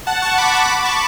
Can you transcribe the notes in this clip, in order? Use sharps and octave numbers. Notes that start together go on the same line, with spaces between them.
F#5 A5
A5 C#6
B5 D6
B5 D6
B5 D6
A5 C#6